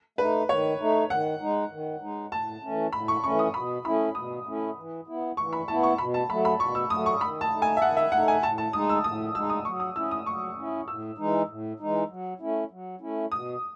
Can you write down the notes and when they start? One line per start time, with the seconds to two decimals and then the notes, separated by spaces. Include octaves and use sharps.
0.18 A3 D#4 B4
0.49 D#3 C#5
0.80 A3 D#4
1.10 D#3 F#5
1.40 G#3 D#4
1.71 D#3
2.02 G#3 D#4
2.32 A2 A5
2.62 E3 A3 C#4
2.93 A2 B5
3.08 C#6
3.23 E3 A3 C#4 C#6
3.39 D#6
3.54 B2 B5
3.85 A3 C#4 E4 B5
4.15 B2 D#6
4.46 A3 C#4 E4
4.76 E3
5.07 B3 E4
5.37 E3 C#6
5.53 B5
5.68 B3 E4 A5
5.83 C#6
5.98 B2 B5
6.14 A5
6.29 F#3 A3 B5
6.45 B5
6.59 B2 C#6
6.75 E6
6.90 F#3 A3 D#6
7.06 C#6
7.20 D#3 B5
7.41 A5
7.51 A3 D#4
7.62 G#5
7.77 E5
7.82 D#3 F#5
7.97 E5
8.12 A3 D#4 F#5
8.28 G#5
8.43 A2 A5
8.58 A5
8.73 G#3 D#4 D#6
8.89 E6
9.04 A2 D#6
9.35 G#3 E6
9.38 D#4
9.50 D#6
9.65 F#3 C#6
9.80 D#6
9.95 C#4 E4 E6
10.11 D#6
10.26 F#3 C#6
10.56 C#4 E4
10.87 A2 E6
11.18 E3 G#3 D#4
11.48 A2
11.79 E3 G#3 D#4
12.09 F#3
12.40 A3 C#4 E4
12.71 F#3
13.01 A3 C#4 E4
13.31 B2 D#6